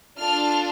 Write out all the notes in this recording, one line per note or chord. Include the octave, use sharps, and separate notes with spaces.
D4 F4 A4 F6